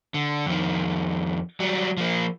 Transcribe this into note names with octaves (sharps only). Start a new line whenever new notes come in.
D3
F2 D#3
F#3 G3
F3 A#3